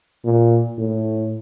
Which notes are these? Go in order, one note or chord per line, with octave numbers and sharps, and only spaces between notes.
A#2
A2